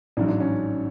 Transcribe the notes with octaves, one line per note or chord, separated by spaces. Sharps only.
A1 G#2 F#3 D4
D4
C#4